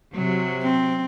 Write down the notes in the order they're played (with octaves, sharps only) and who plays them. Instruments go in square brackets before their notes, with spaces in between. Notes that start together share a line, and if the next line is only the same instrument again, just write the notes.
[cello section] C3 F#3
[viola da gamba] C4